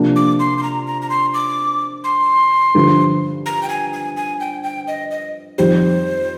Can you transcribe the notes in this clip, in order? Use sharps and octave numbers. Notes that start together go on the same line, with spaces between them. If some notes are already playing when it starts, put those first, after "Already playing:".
Already playing: C3 F3 A#3 D4 G4
D6
C6
C6
A#5
A#5
A#5
C6
D6
C6
G2 D3 F3
A#5
G5
G#5
G#5
G#5
G5
G5
D#5
D#5
F2 D#3 G3 C4 G4 C5